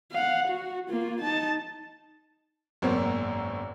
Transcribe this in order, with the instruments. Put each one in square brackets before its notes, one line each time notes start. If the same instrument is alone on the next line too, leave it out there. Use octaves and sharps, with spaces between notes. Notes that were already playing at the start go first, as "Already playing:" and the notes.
[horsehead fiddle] F5 F#5
F#4
A#3 F4
D#4 A5
[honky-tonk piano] G#1 F#2 B2 A#3 C5 C#5